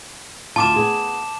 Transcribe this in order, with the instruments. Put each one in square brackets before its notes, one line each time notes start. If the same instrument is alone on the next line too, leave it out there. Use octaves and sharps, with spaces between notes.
[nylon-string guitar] D2 F4 [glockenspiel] A5 D6 E7
[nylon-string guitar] B3 G#4